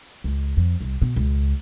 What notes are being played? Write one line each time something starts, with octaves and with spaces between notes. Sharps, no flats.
C#2
F2
C2
B2
C#2